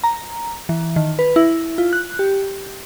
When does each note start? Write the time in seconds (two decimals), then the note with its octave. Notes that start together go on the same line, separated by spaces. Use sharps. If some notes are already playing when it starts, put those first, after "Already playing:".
0.04 A#5
0.69 E3
0.96 D#3
1.19 B4
1.36 E4
1.78 F4
1.93 F#6
2.19 G4